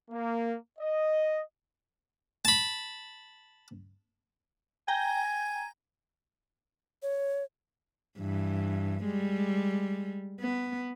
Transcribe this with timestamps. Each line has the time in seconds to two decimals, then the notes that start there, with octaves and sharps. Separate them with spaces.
0.10 A#3
0.78 D#5
2.45 A5 B5
4.88 G5 G#5 A#5
7.02 C#5
8.18 G2 E3
9.03 G3 G#3
10.41 B3